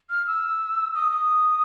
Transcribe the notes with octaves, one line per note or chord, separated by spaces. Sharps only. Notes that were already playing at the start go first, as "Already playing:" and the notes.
F6
E6
D#6
D#6